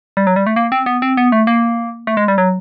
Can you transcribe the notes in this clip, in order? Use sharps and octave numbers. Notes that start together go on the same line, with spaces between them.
G3
F#3
G3
A3
A#3
C4
B3
C4
B3
A3
A#3
A3
G#3
G3
F#3